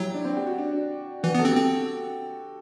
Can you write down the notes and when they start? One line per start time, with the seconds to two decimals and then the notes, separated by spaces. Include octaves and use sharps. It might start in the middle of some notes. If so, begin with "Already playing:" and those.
Already playing: F#3 E4 F#4 G4
0.14 D4
0.25 C4
0.36 G4
0.47 F#4
0.58 D4
1.23 E3 F#4
1.35 B3
1.39 A4
1.45 C4 G4
1.56 C4